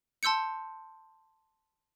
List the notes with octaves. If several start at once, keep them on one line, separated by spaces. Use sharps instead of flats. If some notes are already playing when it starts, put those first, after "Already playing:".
A5 C6 E6 G6 C#7